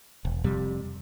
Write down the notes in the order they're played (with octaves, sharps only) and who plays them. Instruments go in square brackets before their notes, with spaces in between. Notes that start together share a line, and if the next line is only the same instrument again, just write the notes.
[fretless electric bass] E1
F2 C3 G3